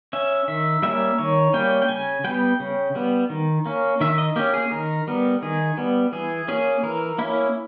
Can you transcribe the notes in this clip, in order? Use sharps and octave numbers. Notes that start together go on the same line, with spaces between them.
C#4 E5
D#3 E5
G3 A#3 C#4 E5
D#3 C#5
G3 A#3 C#4 G5
G5
C#3 G#5
G3 B3 G5
C#3
G3 B3
D#3
A#3 C#4
D#3 E5
D#5
A#3 C#4 G4
G#4
D#3 A#4
G3 B3
D#3 G#4
G3 B3
E3 G#4
A#3 C#4 G#4
E3 A#4
A#3 C#4 E4